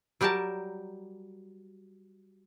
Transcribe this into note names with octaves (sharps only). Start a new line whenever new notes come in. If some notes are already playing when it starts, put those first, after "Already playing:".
F#3 G3 G4 A#4 A5